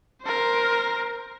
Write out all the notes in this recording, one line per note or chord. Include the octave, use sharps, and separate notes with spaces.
A#4 C5